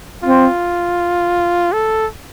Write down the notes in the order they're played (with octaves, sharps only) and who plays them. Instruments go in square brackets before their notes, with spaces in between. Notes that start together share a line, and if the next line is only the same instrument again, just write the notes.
[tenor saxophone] C4 [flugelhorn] F4
[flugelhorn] A4